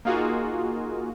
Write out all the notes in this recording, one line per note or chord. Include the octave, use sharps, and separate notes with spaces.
A#3 D#4 F4 F#4 G#4